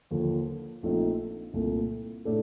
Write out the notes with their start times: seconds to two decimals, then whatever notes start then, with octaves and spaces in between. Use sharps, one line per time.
0.11 D#2 D3 F3
0.83 A#1 A#2 A3 C4 D#4
1.53 C2 A#2 A3
2.25 A2 A3 D4 A4